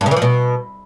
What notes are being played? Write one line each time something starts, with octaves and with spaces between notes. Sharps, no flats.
G2
C#3
E3
F3
B2